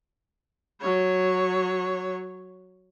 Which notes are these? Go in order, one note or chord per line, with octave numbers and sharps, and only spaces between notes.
F#3 C#5